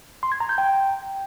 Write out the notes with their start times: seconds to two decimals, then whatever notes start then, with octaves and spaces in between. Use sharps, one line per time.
0.23 C6
0.32 G#6
0.40 A#5
0.49 G6
0.58 G5